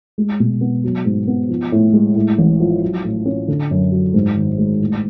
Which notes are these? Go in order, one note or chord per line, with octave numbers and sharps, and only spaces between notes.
G#3
B2
B3
F#3
G#2
B3
F3
A2
G#3
A2
A1
F3
F#3
A2
C#4
D3
F#2
F#3
G#2
G#1
G#3
A2